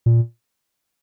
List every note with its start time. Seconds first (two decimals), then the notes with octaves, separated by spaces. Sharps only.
0.06 A#2